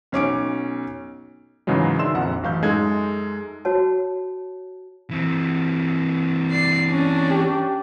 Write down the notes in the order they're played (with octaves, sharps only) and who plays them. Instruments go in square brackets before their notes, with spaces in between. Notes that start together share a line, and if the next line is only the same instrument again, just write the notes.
[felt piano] B1 C#4 D6 D7
[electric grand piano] G#2 C#3 E3 F#3 G#3
D#3 D4 E5 C6 E6 E7
A#1 F2 F#5
A1 F#2 F5 C#6 G6
F#2 G#3 D#4 A4 G#6
[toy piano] F#4 C#5 A5
[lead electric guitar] E3 C4
[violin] D5 C7
C#4 D4
[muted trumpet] G4